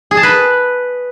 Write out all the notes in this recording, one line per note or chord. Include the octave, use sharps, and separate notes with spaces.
G#4
A5
B4